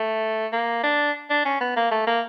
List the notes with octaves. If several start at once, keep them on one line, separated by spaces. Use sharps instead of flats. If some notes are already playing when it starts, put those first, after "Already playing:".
Already playing: A3
A#3
D4
D4
C#4
B3
A#3
A3
A#3